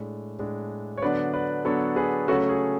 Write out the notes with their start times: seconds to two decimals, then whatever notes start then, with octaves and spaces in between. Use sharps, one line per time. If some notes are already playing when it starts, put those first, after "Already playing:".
Already playing: A2 G#3 D4
0.39 A2 G#3 D4
0.98 C#5
1.02 D3 F#3 B3 D4 B4 D5
1.33 B4 D5
1.65 D3 F#3 B3 D4 A4 C#5
1.96 G#4 B4
2.28 C#3 F#3 A3 C#4 F#4 A4
2.49 G#4